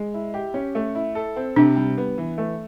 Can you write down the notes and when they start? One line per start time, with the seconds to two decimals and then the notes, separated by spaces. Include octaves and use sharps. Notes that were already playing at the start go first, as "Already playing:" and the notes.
Already playing: G#3
0.14 E4
0.34 G4
0.54 C#4
0.75 A3
0.95 E4
1.15 A4
1.36 C4
1.56 C3 D4
1.76 G3
1.97 B3
2.18 E3
2.38 A3